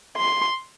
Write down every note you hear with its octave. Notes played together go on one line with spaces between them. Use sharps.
C6